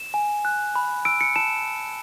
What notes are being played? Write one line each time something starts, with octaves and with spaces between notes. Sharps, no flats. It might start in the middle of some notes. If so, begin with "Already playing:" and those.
Already playing: E7
G#5
F#6
B5
E6 D7
C#7
A5 E7